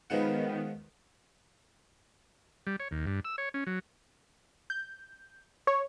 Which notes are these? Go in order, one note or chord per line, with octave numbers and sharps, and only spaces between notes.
D#3 F3 G#3 B3 F#5
G3
C#5
D#2
G2
E6
C#5
C#4
F#3
G6
C#5